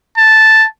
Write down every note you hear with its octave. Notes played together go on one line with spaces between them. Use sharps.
A5